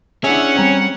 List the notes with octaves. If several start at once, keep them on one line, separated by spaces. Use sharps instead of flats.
C#4 D4 E4 G#4 E5 F#5
G3 C4 C#5 A#5